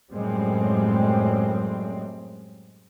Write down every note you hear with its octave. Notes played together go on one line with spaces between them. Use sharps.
F#2 A2 G3 G#3 C4